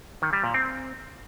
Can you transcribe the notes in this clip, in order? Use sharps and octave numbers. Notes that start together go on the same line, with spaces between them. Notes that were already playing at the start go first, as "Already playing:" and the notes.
D#3
G3
A#2
C4